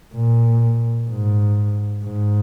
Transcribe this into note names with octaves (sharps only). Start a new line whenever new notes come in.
A#2
G#2
G#2